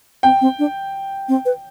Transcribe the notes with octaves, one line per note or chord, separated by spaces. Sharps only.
C4 G5
C4
D4
C4
B4